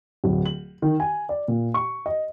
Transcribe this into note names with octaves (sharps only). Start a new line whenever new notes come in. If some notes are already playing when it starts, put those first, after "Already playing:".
D1
F#7
D#3
G#5
D5
A#2
C#6
D#5